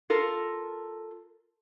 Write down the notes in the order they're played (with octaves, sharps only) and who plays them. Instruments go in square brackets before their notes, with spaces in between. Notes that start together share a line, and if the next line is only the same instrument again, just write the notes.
[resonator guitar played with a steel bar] F4 A4 A#4